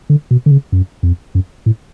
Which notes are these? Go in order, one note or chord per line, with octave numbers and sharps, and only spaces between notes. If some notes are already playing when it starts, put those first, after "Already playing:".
D3
B2
D3
C#3
F#2
F2
F#2
A2